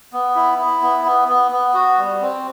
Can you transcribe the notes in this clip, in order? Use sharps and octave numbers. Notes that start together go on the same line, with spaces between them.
B3
E4
E4
B3
B3
B3
B3
F#4
G3
C4